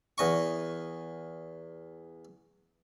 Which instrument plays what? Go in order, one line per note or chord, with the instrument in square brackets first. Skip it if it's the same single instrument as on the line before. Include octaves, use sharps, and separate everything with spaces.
[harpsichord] E2 D#5 C#6